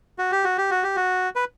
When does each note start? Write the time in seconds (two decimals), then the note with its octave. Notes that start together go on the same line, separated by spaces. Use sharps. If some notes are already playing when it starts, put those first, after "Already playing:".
0.18 F#4
0.32 G4
0.44 F#4
0.57 G4
0.71 F#4
0.83 G4
0.96 F#4
1.36 B4